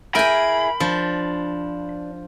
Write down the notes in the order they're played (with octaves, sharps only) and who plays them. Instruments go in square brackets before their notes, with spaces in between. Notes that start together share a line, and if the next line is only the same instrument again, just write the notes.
[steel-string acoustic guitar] E4 G#4 [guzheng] A#4 G5 G#5 [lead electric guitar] B5
[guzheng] F3 [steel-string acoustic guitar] D4